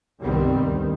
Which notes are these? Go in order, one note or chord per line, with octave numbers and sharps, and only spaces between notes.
C2 G2 D#3 G3 B3 C4
D2 D#3